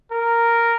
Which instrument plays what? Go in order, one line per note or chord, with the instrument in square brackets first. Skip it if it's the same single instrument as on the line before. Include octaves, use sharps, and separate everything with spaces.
[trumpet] A#4